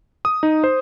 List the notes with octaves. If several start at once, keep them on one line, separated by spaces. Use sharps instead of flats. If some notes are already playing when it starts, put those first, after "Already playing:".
D#6
D#4
C5